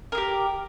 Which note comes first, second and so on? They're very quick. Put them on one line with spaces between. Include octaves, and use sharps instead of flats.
A#4 G#4 G4